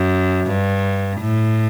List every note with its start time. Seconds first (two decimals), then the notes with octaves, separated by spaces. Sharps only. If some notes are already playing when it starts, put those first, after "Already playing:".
Already playing: F#2
0.46 G2
1.21 A2